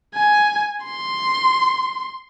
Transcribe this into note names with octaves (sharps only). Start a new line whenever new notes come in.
G#5
C6